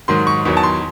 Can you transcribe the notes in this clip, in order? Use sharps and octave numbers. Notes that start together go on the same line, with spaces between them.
G#2 D#3 F#3 C6
C#6
E2 D#3 F#3 C#6
A5
C6